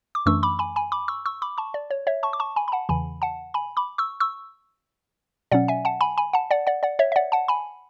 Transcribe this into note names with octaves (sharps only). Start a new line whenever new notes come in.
D6
F#2 E3 A3 D4 C#6 E6
B5 D6
G#5 B5
G#5 B5
B5 D6
C#6 E6
C#6 E6
B5 D6
A5 C#6
D5
C#5
C#5 E5
A5 C#6
D6
A5 C#6
G#5 B5
B5
F#5 A5
E2 C#3 E3 G#5 B5
F#5 A5
G#5 B5
B5 D6
C#6 E6
C#6 E6
B2 F#3 C#4 D5 F#5
E5 G#5
F#5 A5
G#5 B5
G#5 B5
F#5 A5
D5 F#5
D5 F#5
D5 F#5
C#5 E5
E5
D5 F#5
F#5 A5
G#5 B5